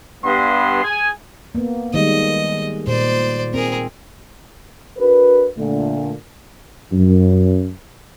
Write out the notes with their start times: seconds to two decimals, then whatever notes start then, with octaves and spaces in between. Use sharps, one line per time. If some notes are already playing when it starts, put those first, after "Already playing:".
0.24 G2 B3 C6
0.83 G#4 G#5
1.55 A#3 B3
1.94 D#3 G3 G#3 D#5
2.87 A#2 C5 D5
3.54 C4 G#4 A#4
4.98 D4 F#4 A#4 B4
5.57 A#2 D3 A3
6.93 F#2